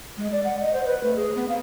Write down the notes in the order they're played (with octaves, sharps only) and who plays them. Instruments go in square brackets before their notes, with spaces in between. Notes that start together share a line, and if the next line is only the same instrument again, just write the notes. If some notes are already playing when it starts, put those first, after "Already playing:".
[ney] G#3
D5
F#5
D#5
C5
B4
A3
G#4
B3
F5